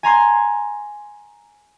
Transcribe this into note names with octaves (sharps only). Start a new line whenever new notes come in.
G#5 A#5 C6 G#6